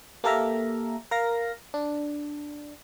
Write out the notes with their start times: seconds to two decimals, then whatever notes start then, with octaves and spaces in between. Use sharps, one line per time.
0.24 A#3 G4 A4 A#4 E5 A#5
1.11 A#4 F5 A#6
1.74 D4